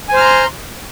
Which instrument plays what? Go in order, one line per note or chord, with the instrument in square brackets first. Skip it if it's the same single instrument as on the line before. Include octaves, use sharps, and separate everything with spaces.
[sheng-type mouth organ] G#5
C5
F6
A#5
C6